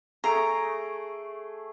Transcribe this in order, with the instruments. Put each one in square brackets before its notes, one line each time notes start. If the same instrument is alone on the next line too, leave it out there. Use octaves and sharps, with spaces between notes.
[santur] A3 G#4 [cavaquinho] A#5 [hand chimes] C#6 C7 D7